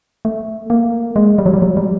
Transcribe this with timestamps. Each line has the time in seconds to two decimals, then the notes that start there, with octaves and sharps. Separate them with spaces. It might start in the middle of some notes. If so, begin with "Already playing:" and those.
0.25 A3
0.70 A#3
1.16 G#3
1.38 G3
1.46 F#3
1.54 G3
1.62 F#3
1.77 G3